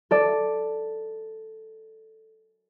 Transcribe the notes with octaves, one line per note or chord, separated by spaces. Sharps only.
A4 D5